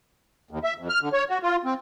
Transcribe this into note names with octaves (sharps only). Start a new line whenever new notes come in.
D#2
E5
F2
F6
D3
C#5
F#4
F4
C4